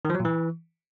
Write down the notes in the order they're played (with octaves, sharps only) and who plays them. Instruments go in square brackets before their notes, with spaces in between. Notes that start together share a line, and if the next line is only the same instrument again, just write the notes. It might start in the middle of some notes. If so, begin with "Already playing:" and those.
[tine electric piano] D#3
F3
F#3
A#2
E3